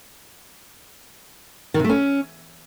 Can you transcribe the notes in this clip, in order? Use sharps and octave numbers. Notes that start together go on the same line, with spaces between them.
D#3
C3
A3
C#4